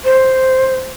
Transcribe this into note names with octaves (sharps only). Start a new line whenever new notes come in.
C5